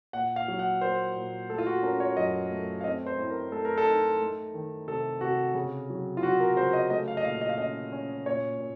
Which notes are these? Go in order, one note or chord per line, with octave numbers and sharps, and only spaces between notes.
A#2 F#5
F5
F#3
F#5
A#3 C5
A#2
A3 A4
F4
F#4
C#4 A#4
C#5
F#2 D#5
A3
F5
C4 D#5
C5
A2
A#4
A3 A4
A#4
A4
D#4
A3
D#3
C3 A4
C3 F#4
C#3
F#3
F4
F#3 F#4
A#4
C#3 C5
D#5
A3 D#5
F5
D#5
A#2 F5
D#5
F5
C#4 D#5
C#4
A#2 C#5
A#2